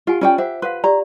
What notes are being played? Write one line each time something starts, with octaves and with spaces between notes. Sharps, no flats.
F4 G4 F#5 G#5
C#4 F4 D5 G5
G4 C5 E5 F#5
B4 F5 F#5 C6
G4 D5 A#5